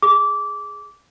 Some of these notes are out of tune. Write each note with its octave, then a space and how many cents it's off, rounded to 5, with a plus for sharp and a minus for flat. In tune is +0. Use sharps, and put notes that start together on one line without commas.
G#4 +0 D6 -15